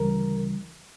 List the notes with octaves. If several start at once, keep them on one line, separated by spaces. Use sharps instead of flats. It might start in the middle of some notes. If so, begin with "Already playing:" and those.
Already playing: D2 C#3 E3 G3 A#4